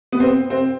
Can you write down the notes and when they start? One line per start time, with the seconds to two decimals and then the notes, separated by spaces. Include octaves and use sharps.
0.12 B3
0.20 C4
0.50 C4